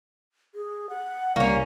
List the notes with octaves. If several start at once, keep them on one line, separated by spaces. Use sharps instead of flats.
G#4
F#5
C2 A#3 C#4 D5 C#6